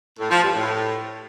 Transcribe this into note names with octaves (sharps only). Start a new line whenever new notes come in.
A2
F3
G2
A2